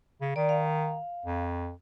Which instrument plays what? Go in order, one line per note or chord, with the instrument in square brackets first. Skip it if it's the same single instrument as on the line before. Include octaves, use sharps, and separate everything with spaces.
[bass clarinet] C#3
[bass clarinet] D#3 [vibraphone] D5
[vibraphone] F5
[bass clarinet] F2